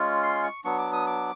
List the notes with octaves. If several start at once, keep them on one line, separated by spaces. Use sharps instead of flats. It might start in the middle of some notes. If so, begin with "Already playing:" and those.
Already playing: G#3 C#4 F4
C6
C#6
F#3 B3 D4 C#6
D6
D#6
D6